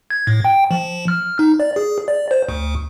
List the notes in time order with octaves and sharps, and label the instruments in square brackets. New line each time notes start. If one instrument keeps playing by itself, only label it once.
[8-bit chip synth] G#6
A2
G5
F3
F6
F6
D#4
D5
G#4
D5
C5
D2